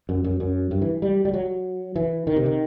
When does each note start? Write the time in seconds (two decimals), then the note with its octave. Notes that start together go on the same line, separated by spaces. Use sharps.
0.09 F#2
0.24 F#2
0.40 F#2
0.71 G2
0.82 E3
1.02 G3
1.25 G3
1.34 F#3
1.96 E3
2.27 D#3
2.36 C3
2.46 D#3